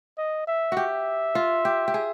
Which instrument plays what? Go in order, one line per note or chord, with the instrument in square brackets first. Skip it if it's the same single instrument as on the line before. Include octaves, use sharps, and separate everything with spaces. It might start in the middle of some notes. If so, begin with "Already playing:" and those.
[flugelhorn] D#5
E5
[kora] F#4 G4 [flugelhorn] E5
[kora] F4
G4
G4
G#4